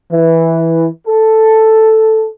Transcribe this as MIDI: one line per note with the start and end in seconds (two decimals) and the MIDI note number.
0.11 0.86 52
1.07 2.27 69